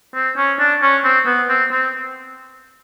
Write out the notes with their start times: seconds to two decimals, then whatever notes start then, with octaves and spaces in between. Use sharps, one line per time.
0.14 C4
0.37 C#4
0.59 D4
0.81 C#4
1.04 C4
1.26 B3
1.49 C4
1.71 C4